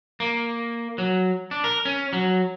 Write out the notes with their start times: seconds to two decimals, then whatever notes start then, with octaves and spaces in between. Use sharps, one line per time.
0.20 A#3
0.98 F#3
1.51 D4
1.64 A#4
1.85 C#4
2.13 F#3